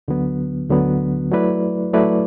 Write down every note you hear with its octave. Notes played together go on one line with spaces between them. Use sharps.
D2 D3 F#3 B3
D2 D3 F#3 B3
F#3 A3 E4 B4 D5
F#3 A3 E4 B4 D5